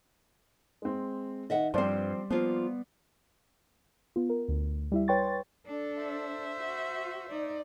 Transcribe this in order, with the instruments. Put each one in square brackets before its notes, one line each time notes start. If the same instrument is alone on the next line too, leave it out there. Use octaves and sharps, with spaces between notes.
[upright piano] G#3 C4
[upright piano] D#3 [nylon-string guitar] D#5 E5 F#5
[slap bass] G2 [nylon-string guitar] F3 C4 [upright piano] G3 D5 C6
[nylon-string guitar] F3 A#3 F4 [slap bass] B3
[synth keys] B3 F4
A#4
D2
G3 E4 E5
B4 C#5 G5 C6 C#6 A6
[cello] D4 A4
[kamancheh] C5 E5
[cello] F#4
D#4 D5